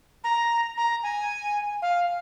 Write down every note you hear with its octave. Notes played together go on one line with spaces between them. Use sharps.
A#5
A#5
G#5
F5